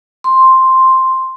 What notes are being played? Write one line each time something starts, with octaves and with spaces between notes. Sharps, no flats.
C6